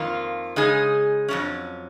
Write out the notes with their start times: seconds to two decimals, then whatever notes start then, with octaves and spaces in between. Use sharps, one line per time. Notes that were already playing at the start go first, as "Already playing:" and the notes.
Already playing: F2 D#3 A#3 F4
0.56 C#3 G#3 D#4 G#4
1.29 F2 D#3 F#3 C#4